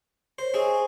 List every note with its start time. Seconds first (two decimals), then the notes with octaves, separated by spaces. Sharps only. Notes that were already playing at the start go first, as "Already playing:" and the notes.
0.39 A#4 C5 C#5
0.54 C4 G#4 D#5 G#5 C#6